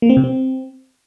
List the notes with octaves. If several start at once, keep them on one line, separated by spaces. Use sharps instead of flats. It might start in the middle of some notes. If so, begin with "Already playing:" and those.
A#3
C4
C3
C4